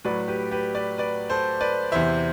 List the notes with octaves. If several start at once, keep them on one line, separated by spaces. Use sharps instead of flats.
A2 F#3 B4 D5
G4 B4
G4 B4
B4 D5
B4 D5
A4 C5
B4 D5
E2 C3 E3 C5 E5